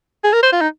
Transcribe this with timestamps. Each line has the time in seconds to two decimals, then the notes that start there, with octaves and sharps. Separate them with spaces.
0.24 G#4
0.33 A#4
0.43 C5
0.52 F4
0.61 D#4